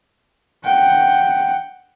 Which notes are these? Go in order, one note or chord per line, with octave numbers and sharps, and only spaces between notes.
F#5 G5